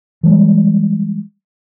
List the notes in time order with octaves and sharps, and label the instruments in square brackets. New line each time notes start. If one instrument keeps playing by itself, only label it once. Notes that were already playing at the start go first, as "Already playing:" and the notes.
[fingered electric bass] E3 G3 G#3